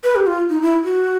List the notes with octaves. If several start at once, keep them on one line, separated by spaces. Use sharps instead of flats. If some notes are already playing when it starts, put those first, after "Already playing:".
B4
G4
F4
D#4
E4
F#4